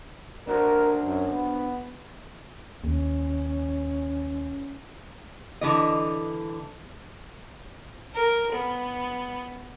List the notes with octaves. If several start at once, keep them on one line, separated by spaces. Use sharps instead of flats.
D4 F#4 A#4 C5
F#2
B3
D#2 C#4
D3 E3 D#5
A#4
B3